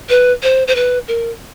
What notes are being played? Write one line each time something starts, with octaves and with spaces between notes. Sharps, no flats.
B4
C5
C5
B4
A#4